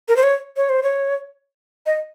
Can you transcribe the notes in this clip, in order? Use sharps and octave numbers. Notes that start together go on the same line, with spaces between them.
A#4
C5
C#5
C#5
C5
C#5
D#5